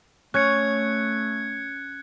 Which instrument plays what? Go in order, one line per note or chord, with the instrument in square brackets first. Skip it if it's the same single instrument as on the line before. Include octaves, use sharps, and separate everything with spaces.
[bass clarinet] A3 [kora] C#4 [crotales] F#6 G#6 C#7